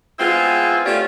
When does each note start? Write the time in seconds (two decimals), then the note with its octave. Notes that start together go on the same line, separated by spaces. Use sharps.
0.19 G#3 B3 C4 E4 F4 G#4
0.85 A3 B3 C#4 F4 G4 D5